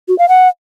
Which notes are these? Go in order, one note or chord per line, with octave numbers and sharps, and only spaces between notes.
F#4
F5
F#5